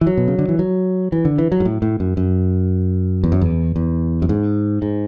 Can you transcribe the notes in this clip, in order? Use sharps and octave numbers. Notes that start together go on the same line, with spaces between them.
E3
F#3
B2
C#3
D3
E3
F#3
E3
D3
E3
F#3
G#2
A2
A2
F#2
F#2
E2
F#2
E2
E2
F#2
G#2
G#2